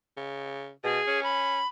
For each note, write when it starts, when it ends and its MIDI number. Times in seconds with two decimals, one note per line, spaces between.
0.17 0.71 49
0.84 1.00 47
0.84 1.23 68
1.07 1.60 61
1.24 1.67 83